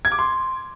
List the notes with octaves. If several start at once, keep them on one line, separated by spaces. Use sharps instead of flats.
G#6
D6
C6